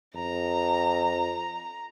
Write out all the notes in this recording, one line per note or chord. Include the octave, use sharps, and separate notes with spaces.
F2 A#5